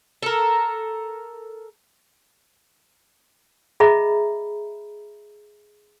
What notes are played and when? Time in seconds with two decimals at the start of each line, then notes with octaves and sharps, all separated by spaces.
0.22 A4 A#4
3.80 G#4 D#5 E5 A#5 B5